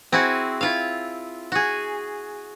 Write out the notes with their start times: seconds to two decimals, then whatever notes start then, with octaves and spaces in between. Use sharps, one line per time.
0.12 C4 E4 F#4 G#4
0.61 E4 F4 F5
1.52 F#4 G#4